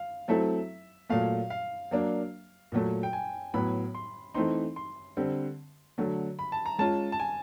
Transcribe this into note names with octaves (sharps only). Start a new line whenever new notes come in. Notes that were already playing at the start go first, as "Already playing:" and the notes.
Already playing: F5
F#3 A3 C4 E4 A4 E5
A#2 F#3 A3 F5
F5
F#3 A#3 D4
A#2 F#3 A3
G5
G#5
A2 F#3 B3 B5
C6
E3 A3 C4 D#4 C6
C6
D3 G3 C4
D3 F#3 A3
B5
A5
A#5
G#3 C#4 F4 A5
A5
G#5